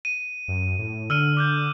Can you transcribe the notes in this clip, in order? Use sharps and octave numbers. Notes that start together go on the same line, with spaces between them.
D#7
F#2
A2
D3 E6 F6 D#7
D6 F#6 G6